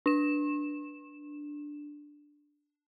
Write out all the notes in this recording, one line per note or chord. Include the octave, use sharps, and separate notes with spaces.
D4 E7